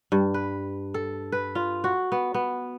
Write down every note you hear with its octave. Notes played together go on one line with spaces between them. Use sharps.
G2
B4
A4
B4
F4
F#4
B3
B3